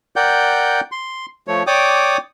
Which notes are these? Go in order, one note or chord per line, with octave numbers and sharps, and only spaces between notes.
A#4 D5 F#5 G5 G6
C6
F3 A3 C#5
C#5 D5 G5 D6 D#6